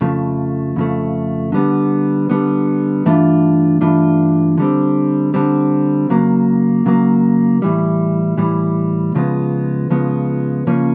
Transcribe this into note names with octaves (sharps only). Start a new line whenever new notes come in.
F2 C#3 F3 A3
F2 C#3 F3 A3
D3 G3 B3
D3 G3 B3
G2 E3 A3 D4 F4
G2 E3 A3 D4 F4
D3 G3 C4
D3 G3 C4
C#3 F#3 A#3
C#3 F#3 A#3
A2 E3 G3
A2 E3 G3
C#2 C#3 F3 G#3 B3
C#2 C#3 F3 G#3 B3
C#3 F3 A#3 C#4